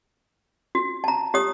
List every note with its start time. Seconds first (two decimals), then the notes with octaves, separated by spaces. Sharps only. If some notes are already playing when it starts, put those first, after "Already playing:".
0.75 F#4
1.04 A5 A#5
1.34 G4 C#5 D#6